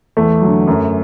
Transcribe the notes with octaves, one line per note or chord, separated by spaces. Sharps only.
E2 A3
D3 F#3
F#2